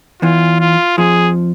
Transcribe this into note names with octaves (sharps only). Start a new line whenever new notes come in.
E2 E3 F4
F4
F2 F3 G#4